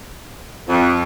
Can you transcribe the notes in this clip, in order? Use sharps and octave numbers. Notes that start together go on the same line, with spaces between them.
F2